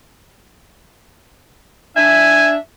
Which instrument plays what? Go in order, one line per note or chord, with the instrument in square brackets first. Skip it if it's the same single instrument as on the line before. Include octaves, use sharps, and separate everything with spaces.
[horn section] D4 E5 [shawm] G#5